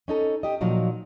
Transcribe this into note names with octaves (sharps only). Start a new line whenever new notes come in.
C#4 D#4 A4
G4 D#5
A#2 F3 F#3 D#4